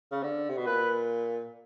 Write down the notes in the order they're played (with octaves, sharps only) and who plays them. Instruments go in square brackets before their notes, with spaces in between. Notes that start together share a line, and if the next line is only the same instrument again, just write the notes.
[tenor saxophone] C#3
D3
C3
B2
[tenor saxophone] A#2 [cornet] B4